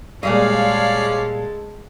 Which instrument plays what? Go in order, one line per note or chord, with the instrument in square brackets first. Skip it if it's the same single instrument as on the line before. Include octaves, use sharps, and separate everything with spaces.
[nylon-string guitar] A#2 G3 D#5 [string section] G#3 A4 [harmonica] C#4 D5 [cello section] F5